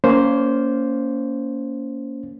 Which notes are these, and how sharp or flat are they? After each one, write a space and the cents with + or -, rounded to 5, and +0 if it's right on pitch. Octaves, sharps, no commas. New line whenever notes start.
A#3 +0 C#4 +20 C5 +0